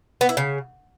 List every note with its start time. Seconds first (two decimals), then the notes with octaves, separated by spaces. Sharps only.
0.21 B3
0.29 E4
0.37 C#3